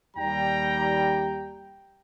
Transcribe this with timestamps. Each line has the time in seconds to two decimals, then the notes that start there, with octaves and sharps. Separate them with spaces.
0.17 D#2 G3 G5 A#5